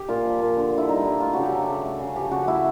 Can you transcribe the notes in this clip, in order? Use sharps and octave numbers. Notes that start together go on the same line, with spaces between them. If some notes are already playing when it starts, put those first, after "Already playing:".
Already playing: G4
A#2 F4
F3
A#2
D3
D3 E4
G3 D#4
G3 E4
A3 F4
C#3 F#4
G4
F#3 A4
C#3
A3
C#3
F3 G4
C#3 F#4
A3 E4